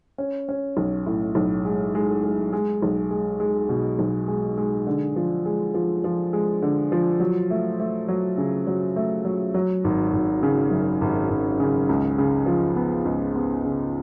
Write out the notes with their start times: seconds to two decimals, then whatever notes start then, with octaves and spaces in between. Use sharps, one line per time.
0.18 C#4
0.49 C#4
0.77 B1
1.06 A2
1.35 B1
1.65 G#3
1.95 G#3
2.24 G#3
2.53 G#3
2.82 B1
3.11 G#3
3.40 G#3
3.69 B2
3.99 B1
4.28 G#3
4.58 G#3
4.87 D3
5.16 F3
5.45 G#3
5.74 F3
6.04 F3
6.33 G#3
6.62 D3
6.92 F3
7.20 F#3
7.50 A3
7.80 A3
8.08 F#3
8.38 C#3
8.67 F#3
8.96 A3
9.25 F#3
9.54 F#3
9.84 G#1
10.13 G#1
10.43 C#3
10.71 F#2
11.01 G#1
11.30 G#1
11.60 C#3
11.89 C#2
12.18 C#3
12.46 F3
12.76 B3
13.05 C#2
13.35 B3
13.64 C#3